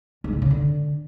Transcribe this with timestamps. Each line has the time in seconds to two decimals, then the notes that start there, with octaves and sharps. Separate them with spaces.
0.24 G#2
0.33 D3
0.42 C#3
0.50 D3